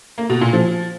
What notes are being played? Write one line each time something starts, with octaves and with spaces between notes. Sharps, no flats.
A#3
B2
A#2
F3